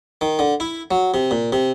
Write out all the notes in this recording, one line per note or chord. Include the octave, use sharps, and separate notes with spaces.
D#3
D3
E4
F#3
C3
A#2
C3